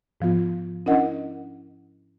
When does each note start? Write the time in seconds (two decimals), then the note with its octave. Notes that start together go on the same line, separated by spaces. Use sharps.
0.21 G#2 F3 B3 F4
0.86 C#4 D4 E4 A#4 D#5 F#5